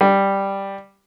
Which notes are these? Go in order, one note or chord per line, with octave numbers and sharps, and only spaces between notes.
G3